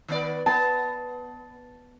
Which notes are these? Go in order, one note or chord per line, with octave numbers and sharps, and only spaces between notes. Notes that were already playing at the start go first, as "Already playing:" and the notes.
D#3 B3 D5
B3 A5